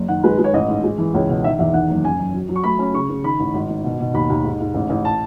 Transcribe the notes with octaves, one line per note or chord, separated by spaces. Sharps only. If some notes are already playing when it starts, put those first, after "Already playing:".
Already playing: F#1
D#3 F#5
G#3 B4
G#3
C#5
A1 D#5
G#2
G#3
E3
C#2 C#5
B2
D#3 E5
E2 E5
D#3 F#5
F#1
F#2 G#5
F#2
F#3
F#3
C#6
A3 B5
C#4 B5
C#3 C#6
C#3
D#3 B5
A1
G#1
D#3
B2
B2
D#2 B5
D#2
G#2
G#2
A1
A1
A5